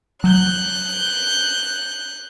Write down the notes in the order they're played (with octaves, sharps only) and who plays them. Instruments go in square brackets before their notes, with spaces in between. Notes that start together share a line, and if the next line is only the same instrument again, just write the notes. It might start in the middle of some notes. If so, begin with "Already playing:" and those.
[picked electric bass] F#3 [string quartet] F#6 G6